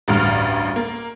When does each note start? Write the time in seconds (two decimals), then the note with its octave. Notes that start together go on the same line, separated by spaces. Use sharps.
0.08 A1 D2 G2 A#5 F6
0.76 A#3